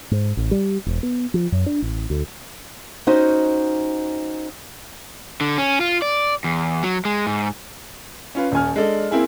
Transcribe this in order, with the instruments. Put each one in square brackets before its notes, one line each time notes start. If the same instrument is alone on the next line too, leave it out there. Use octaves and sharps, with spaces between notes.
[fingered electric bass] G#2
A1
G3
E1
B3
F3
F#2
D4
A1
D2
[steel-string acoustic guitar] C#4 D#4 F#4 C5 D#5
[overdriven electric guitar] D3
C#4
F4
D5
E2
F#3
G#3
G#2
[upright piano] C#4 F4 B4
D#1 C#4 G#5 F6
G#3 D4 A4 D5
A#3 C4 E4 G#4